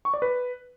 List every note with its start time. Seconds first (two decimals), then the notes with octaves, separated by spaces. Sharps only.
0.05 C#6
0.14 D5
0.22 B4